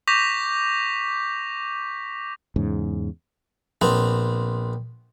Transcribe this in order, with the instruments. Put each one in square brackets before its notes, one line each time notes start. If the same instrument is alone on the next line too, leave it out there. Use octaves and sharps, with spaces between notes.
[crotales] C#6 D6 G6 A#6 B6 F7
[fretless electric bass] E2 G#2 C#3
[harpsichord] A#1 B3 C4